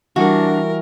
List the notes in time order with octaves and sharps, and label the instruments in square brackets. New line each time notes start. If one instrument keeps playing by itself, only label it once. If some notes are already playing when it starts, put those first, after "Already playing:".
[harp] E3 G3 [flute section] D4 [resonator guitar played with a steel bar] F#4 [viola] A#4